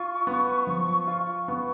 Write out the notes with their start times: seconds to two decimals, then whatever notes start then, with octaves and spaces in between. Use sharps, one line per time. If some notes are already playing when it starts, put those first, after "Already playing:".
Already playing: F4 C#6
0.27 B3
0.67 F3
1.07 F4
1.48 B3